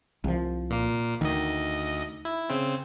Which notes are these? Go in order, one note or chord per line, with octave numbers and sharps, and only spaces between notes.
C2 F3
A#2 A#3
D2 D#3 D#5
E4
C#3 C4